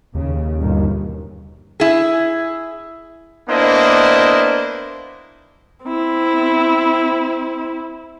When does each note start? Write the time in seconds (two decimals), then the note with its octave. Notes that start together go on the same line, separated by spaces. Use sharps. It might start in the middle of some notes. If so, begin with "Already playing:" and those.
0.15 D#2 C#3
0.60 G1 B2 D#3
1.80 E4 G#4
3.49 A#3 B3 D4 E4 C5 D#5
5.85 C4 E4